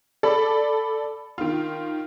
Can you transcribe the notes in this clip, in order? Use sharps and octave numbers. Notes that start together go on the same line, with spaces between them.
A4 D5 B5
D#3 F4